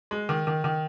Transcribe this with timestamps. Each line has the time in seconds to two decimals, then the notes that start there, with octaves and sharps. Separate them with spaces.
0.11 G#3
0.29 D#3
0.47 D#3
0.64 D#3